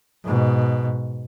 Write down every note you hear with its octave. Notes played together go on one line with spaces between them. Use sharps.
G#2 B2